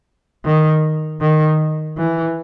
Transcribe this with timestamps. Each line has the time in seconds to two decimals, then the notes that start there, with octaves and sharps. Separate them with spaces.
0.45 D#3
1.21 D#3
1.98 E3